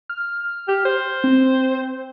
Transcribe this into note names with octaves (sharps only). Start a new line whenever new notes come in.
F6
G4
C5
C4